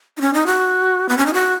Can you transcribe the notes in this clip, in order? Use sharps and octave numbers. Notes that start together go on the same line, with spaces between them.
D#4
C#4
D#4
F#4
B3
C#4
D#4
F#4